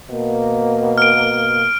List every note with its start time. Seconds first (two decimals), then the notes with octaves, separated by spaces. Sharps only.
0.10 B2 A#3
0.98 F6 D7